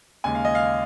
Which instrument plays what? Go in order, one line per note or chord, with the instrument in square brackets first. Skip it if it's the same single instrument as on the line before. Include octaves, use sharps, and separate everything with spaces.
[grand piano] D#2 C#3 G#3 G#5
F5
D#5
F5